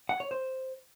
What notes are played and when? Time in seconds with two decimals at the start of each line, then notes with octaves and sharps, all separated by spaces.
0.09 F#5
0.20 C#5
0.31 C5